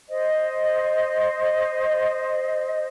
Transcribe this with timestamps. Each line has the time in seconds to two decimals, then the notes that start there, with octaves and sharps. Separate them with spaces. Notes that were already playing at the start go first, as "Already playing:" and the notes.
0.10 C5 D#5